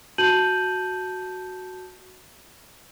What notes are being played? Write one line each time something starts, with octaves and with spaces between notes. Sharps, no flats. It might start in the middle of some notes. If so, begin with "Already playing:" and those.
F#4 A5 G6 D#7 F#7